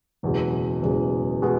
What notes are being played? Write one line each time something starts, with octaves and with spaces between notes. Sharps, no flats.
F#1 E2 B2 G#3
F#1 E2 B2 G#3
B2 G#3